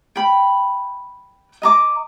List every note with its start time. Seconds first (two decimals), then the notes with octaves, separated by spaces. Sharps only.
0.16 G5 B5
1.62 D#5 A#5 D6